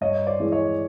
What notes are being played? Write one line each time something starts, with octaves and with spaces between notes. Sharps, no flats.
G2 C#5 D#5
C5 D5
E3 G#3
C#5 D#5